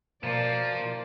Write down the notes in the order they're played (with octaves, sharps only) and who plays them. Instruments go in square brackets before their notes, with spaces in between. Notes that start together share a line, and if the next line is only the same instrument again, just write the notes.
[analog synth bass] B2 [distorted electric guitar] F3 [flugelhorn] A#3 [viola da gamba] D5